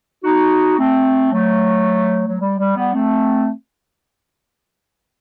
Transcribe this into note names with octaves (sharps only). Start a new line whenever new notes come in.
D#4 F#4
A3 C4
F#3 A3
F#3
G3
G3
G3 B3
A3 C4